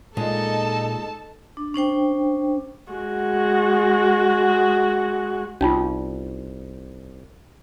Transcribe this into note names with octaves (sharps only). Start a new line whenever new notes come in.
A#2 G#3 D#4 A4 A5
D4
C#4 D4 C5 G5
G#3 F#4
C2 C#4 D#4 F4